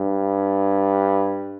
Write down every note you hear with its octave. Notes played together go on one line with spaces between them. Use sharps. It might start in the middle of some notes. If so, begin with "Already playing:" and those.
Already playing: G2